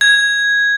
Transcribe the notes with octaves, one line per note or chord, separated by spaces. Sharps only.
G#6